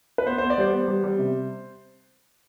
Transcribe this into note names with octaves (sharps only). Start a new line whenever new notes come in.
B4
B3 C5
B3 C5
D5
G3 C5
B3
G3
G3
C3